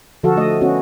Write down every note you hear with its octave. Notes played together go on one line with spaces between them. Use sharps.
D3 F3 F#4 A4 F5
A3 D#5
B3 C#4 F#4